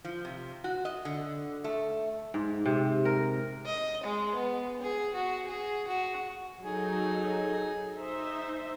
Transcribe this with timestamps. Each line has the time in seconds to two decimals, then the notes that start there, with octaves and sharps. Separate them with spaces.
0.05 F3
0.25 C3
0.64 F#4
0.85 D#5
1.05 D3
1.64 A3
2.34 G#2
2.66 C3
3.05 A#4
3.66 D#5
4.04 G#3
4.35 B3
4.82 G#4
5.14 F#4
5.48 G#4
5.88 F#4
6.62 F#3 D#4 G#4 A4
7.96 D#4 C5 E5